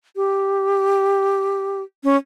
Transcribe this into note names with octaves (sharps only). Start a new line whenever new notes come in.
G4
C#4